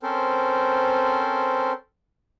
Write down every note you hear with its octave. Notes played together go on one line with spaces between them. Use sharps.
C4 C#4 A4 A#4 C5